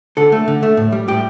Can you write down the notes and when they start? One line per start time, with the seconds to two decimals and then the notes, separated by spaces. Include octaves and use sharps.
0.17 D3 A4
0.32 A3
0.48 D3
0.63 A3
0.77 A2
0.92 G3
1.08 A2 G4